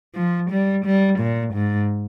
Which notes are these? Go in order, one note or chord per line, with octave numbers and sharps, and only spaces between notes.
F3
G3
G3
A#2
G#2